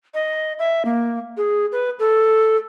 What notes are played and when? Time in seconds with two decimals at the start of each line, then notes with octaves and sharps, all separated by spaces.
0.14 D#5
0.59 E5
0.85 A#3
1.37 G#4
1.72 B4
1.99 A4